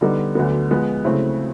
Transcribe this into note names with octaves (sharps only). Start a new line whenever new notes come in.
D3 G3 B3 D#4
D2 D3 F#3 B3
F3 G#3 B3
C#3 F#3 A3 C4 E4